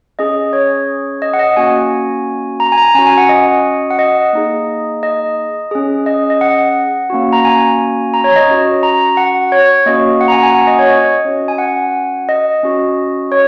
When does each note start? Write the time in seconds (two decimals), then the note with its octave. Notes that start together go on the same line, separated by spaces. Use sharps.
0.19 C#4 G#4 D#5
0.53 C#5
1.22 D#5
1.33 F#5
1.39 D#5
1.57 A#3 C#4 F#4 G#5
2.60 A#5
2.72 G#5
2.78 A#5
2.95 C#4 G#5
2.99 F#4
3.07 G#5
3.18 F#5
3.29 D#5
3.91 F#5
3.99 D#5
4.33 A#3 D#4 G#4
5.03 D#5
5.71 C#4 G#4
6.06 D#5
6.30 D#5
6.41 F#5
7.10 A#3 C#4 F#4
7.33 A#5
7.45 G#5
8.14 A#5
8.24 C#5
8.36 D#5
8.47 C#4 F#4
8.83 A#5
9.17 F#5
9.52 C#5
9.86 A#3 C#4 F#4 D#5
10.21 F#5
10.28 A#5
10.32 G#5
10.43 G#5
10.55 F#5
10.67 D#5
10.79 C#5
10.89 D#5
11.25 C#4 F#4
11.48 G#5
11.58 F#5
12.29 D#5
12.63 C#4 F#4
13.32 C#5